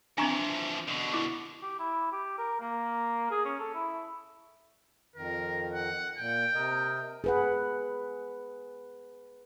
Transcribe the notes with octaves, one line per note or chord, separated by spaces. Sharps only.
E3 F3 C4 D4 G#5 A#5 C#6
B2 D3
E4 D6
G4
E4
G4
A#4
A#3
G#4
C#4
A4
E4
F2 D#3 A#4
F#5
A#2 G5
C3 A#4 D#5
G#4 B4 F#5